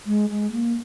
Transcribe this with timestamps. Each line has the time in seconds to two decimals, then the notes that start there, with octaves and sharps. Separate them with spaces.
0.06 G#3
0.30 G#3
0.52 A#3